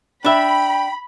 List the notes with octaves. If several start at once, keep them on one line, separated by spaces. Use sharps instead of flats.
D4 E5 G5 B5